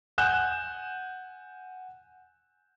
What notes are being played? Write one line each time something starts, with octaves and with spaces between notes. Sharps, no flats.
F#5 G#5 F#6 G6 E7